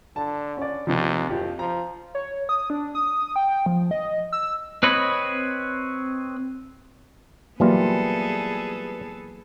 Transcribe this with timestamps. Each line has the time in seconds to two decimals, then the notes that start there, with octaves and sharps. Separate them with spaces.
0.16 D3 A5
0.57 C#4 D5
0.87 D#2 C3 F3
1.29 F#1 F2 F4 G4
1.59 F3 A#5
2.15 C#5
2.49 D#6
2.70 D4
2.95 D#6
3.36 G5
3.66 F3
3.91 D#5
4.33 E6
4.83 C4 B4 C#5 D#5 B5
7.60 E3 F#3 G3 A#3 B3 F4 G#4 A4